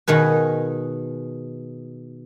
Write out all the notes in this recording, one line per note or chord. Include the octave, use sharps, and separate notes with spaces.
B2 D#3 G#4 B4